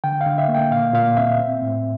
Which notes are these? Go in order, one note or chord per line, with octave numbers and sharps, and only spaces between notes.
D3 G5
F5
D3
E5
A#3
G5
A#2 F5
A#2 F5
C4 E5
C4
A2